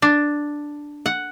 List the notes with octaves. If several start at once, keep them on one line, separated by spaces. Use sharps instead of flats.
D4
F#5